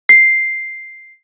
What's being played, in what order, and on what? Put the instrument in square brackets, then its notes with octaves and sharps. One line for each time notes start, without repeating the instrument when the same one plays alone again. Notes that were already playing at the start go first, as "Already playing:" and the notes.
[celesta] C7